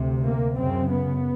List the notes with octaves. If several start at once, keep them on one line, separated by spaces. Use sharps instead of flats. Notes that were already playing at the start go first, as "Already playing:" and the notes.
Already playing: D2 C3
A#3
F#2 C#3 C4
B3